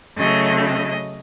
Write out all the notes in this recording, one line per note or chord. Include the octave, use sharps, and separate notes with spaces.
C#3 F#3 A3 D#5
D#5